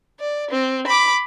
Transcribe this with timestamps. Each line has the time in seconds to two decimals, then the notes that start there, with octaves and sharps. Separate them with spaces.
0.19 D5
0.51 C4
0.87 B5 D6